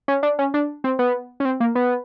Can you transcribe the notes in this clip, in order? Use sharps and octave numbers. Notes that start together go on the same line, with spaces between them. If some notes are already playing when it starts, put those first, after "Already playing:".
C#4
D4
C#4
D4
C4
B3
C#4
C4
A#3
B3